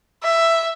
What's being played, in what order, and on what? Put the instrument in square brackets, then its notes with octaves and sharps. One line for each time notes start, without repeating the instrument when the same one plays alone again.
[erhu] E5